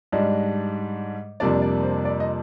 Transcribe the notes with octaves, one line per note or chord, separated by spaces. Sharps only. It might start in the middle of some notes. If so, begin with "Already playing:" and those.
G#2 G3 D4 D#5
F2 C3 G3 A#3 D4 D5
D5
C5
D5
D#5